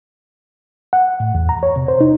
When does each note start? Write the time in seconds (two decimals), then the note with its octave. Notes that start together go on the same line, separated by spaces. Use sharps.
0.93 F#5
1.20 A2
1.35 E2
1.49 A#5
1.63 C#5
1.76 C3
1.88 C5
2.01 D#4